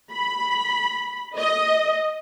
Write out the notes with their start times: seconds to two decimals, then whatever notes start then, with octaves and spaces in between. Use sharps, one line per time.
0.11 B5
1.37 D#5